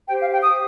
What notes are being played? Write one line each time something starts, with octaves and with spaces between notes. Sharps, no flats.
G4 C5 G5
F5
G5
G4 C5 D#6